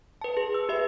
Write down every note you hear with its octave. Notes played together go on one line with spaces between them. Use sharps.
B4 A5
G#4
E6
G4 B4 E5